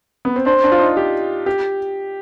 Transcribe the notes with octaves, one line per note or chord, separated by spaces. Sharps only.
B3
C4
D4 C5
D4
F4
D#4
G4
G4